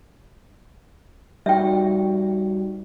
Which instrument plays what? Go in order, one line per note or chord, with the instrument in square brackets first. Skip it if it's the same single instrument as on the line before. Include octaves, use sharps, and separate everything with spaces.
[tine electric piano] G3 D#4 F#4 [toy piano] E5 G5